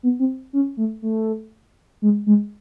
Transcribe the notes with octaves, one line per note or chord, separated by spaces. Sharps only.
B3
C4
C#4
A3
A3
G#3
G#3